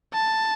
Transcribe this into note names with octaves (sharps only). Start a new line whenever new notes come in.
A5